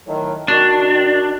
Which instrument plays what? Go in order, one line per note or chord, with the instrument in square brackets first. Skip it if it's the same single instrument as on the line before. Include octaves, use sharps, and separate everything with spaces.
[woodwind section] A2 D#3 F#3
[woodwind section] D#3 F#4 [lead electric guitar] D4